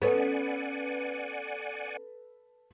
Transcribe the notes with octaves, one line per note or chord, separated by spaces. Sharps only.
B3 C#4 A4 B4 D5 F#5 G#5